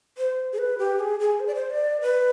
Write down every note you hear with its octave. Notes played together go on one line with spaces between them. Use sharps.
C5
G#4
B4
G4
G#4
G#4
C5
D5
C5
D5
B4